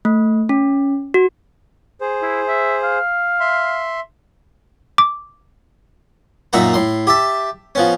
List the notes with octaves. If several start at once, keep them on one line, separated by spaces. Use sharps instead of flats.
A3
C#4
F#4
G#4 C5
E4
E5
F5
E5 C6
D6
F#2 A#2 D#4 E5 F#5 A#5
A2 C6
G4 E5 A5
F3 B3 C#4